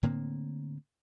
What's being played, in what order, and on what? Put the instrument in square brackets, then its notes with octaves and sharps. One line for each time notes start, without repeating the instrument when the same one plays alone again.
[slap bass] A2 D3 A#3 C4